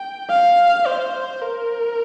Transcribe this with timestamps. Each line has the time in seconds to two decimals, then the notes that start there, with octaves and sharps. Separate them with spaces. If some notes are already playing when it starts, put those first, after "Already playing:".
Already playing: G5
0.30 F5
0.87 C5
1.41 A#4